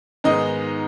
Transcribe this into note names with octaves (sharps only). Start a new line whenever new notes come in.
G#2 D#3 G#3 B3 D#4 D#5